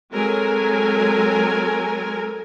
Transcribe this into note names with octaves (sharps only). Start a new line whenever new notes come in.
F#3 G#3 C4 A4 A#4 G#5